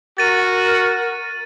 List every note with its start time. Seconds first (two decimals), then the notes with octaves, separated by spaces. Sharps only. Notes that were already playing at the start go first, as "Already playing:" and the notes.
0.18 F#4 A#4 A6 D#7